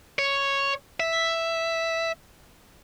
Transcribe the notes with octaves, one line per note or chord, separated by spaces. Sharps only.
C#5
E5